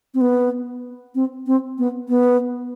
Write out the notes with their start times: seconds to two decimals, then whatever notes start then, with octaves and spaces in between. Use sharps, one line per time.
0.14 C4
0.21 B3
1.15 C4
1.47 C4
1.78 B3
2.09 B3